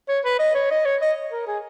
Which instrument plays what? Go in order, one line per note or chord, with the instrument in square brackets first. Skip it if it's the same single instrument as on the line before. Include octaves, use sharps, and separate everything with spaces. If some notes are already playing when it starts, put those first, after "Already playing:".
[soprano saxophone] C#5
B4
D#5
C#5
D#5
C#5
D#5
A#4
G#4